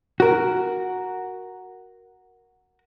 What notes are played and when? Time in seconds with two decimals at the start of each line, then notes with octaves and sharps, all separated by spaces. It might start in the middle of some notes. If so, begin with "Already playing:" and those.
0.20 F#4 A#4